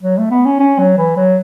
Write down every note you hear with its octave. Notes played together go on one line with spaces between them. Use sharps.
F#3
A3
B3
C#4
C#4
F#3
E3
F#3